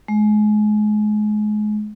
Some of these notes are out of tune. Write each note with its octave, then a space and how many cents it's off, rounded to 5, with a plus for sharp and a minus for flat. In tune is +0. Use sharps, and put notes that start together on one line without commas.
G#3 +30